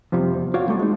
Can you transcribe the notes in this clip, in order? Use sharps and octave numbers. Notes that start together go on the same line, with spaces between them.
F2 C3 F3 G3
E2
F4 F#4 C#5 D5 F5
A2 G3 A3
G#3 D#4